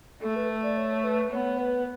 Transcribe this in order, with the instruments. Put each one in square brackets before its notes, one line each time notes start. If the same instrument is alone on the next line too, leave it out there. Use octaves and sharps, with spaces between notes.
[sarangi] A3 [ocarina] A4
[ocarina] B4
D5
C#5
B4
[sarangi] B3 [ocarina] C#5
[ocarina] B4